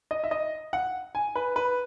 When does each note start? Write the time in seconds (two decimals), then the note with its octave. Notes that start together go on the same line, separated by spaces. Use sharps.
0.11 D#5
0.24 E5
0.31 D#5
0.73 F#5
1.15 G#5
1.35 B4
1.56 B4